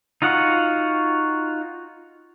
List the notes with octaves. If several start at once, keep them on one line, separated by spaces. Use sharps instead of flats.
D#4 F4 F#4 F#5